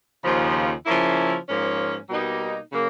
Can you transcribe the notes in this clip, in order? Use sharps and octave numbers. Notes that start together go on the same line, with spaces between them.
D#2 C#3 F3
C#3 F3 A#3 C#4 E4
G#2 F3 A#3 C#4
B2 G3 A#3 D#4
C#3 F#3 A#3